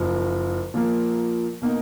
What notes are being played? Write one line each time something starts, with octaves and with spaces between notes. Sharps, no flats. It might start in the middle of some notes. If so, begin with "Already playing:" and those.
Already playing: F#1 F#2 F3
A#2 F3 A#3
B2 A#3 D#4